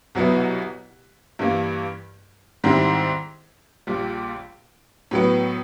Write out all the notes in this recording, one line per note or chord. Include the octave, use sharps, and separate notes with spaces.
C2 B2 F#3 B3 E4
G2 E3 G3 A#3
G#2 D#3 G3 C4 E4
A#1 A#2 G3
A2 F#3 B3